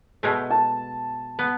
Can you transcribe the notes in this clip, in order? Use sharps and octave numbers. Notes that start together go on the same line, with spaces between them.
B2 G#3 A3
A5
B3